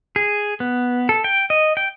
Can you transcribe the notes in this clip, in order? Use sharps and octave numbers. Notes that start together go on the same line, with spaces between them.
G#4
B3
A4
G5
D#5
G5